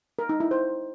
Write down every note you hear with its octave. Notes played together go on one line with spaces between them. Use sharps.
A#4
D#4
E4
C5